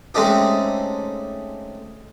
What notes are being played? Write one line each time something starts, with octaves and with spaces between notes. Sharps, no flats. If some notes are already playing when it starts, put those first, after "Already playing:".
G#3 A3 C4 C#4 D#4 G4